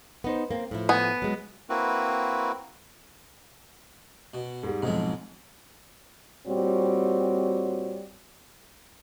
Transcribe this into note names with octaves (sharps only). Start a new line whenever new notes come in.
B3 D#4 C5
A#3 C4
A2 F3 E4
B3 G#5
F#3 G#3
A#3 C4 E4 F#4 B4
B2
G#2 G3
B1 F2 G#2 G#3
A#2 G3 C4 F#4 C#5